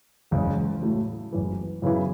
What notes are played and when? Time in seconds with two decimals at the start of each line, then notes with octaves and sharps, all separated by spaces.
0.31 F#1 E2 C#3 G#3
0.82 A2 F#3 A3 E4
1.32 F#1 F#2 E3
1.82 F#2 C#3 E3 B3 E4